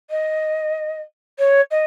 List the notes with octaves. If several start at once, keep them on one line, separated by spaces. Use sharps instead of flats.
D#5
C#5
D#5